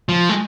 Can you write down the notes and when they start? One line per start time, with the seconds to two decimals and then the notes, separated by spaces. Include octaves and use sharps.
0.09 F3
0.29 G#3